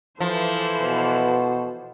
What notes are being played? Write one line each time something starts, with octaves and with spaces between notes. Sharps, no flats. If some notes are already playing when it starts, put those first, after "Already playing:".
E3 F3 A4 C5
B2